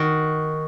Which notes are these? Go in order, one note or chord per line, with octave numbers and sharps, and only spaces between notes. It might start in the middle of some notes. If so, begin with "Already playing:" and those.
Already playing: D#3 F#4